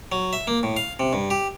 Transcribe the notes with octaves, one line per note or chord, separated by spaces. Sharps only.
F#3
E5
A#3
A2
F5
C3
G2
G4